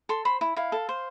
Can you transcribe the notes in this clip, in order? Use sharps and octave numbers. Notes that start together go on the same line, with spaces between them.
A4 C6
C5 B5
E4
E4 F5
A4
C5